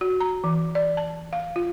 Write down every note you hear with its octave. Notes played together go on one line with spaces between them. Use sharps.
F#4
A#5
E3
D5
A5
F5
F4